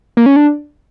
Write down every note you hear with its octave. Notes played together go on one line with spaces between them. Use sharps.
A#3
C#4
D4